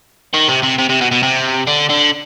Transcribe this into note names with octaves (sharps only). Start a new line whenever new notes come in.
D#3
C3
C3
C3
C3
B2
B2
C3
D3
D3